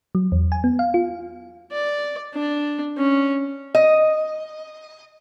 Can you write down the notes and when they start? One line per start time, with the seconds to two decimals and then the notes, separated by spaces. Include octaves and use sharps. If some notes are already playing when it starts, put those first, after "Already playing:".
0.15 F#3
0.32 E2
0.52 G#5
0.64 B3
0.79 F5
0.94 F4
1.72 D5
2.34 D4
2.97 C#4
3.75 D#5